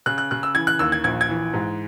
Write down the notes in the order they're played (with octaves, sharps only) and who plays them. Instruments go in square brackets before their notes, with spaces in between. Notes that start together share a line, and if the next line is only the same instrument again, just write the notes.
[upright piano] C#3 F#6
F#6
C#3 F#6
E6
E3 G#6
F#6
D#2 E6
G#6
A#1 G#6
G#6
E3
G#2